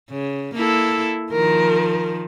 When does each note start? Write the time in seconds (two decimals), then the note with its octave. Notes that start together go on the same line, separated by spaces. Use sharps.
0.11 C#3
0.55 A#3 E4 A4
1.33 D#3 F3 A#4